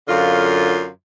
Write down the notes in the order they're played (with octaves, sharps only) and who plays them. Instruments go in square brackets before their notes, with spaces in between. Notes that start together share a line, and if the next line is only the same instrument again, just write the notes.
[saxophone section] F#2 D3 F4